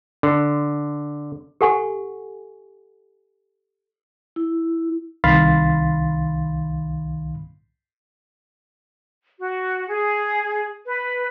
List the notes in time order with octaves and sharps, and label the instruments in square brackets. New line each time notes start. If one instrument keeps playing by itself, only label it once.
[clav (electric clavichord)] D3
[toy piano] G4 A4 F#5 G#5 C#6
[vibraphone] E4
[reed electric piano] C2 D#3 F5 B5 C6 A6
[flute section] F#4
G#4
B4